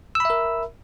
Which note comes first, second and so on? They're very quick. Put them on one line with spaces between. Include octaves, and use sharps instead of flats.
E6 B5 E5 A#4